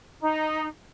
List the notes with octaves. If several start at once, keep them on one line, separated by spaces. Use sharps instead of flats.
D#4